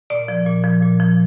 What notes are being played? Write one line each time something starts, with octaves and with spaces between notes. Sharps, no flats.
A#2 D5
F3
A#2
F3
A#2
F3